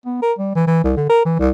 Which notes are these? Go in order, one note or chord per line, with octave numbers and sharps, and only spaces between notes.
B3
A#4
G3
E3
E3
C2
D3
A#4
E3
C2